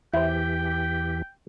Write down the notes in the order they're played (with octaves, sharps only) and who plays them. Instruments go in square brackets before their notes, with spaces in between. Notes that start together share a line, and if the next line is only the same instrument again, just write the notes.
[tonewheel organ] E2 E3 G4 [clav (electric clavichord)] E4 C5 [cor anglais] G5